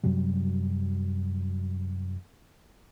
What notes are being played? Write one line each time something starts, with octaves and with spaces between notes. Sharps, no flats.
F#2 C3 F#3 G3